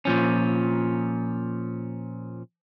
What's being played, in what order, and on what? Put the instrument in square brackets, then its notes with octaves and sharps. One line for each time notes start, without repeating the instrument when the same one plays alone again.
[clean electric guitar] A#2 F3 C#4